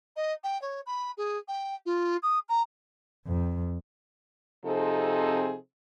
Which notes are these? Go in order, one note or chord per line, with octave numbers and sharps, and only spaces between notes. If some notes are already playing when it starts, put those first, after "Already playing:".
D#5
G5
C#5
B5
G#4
G5
F4
D#6
A#5
F2
C3 F3 C4 D#4 G#4 A4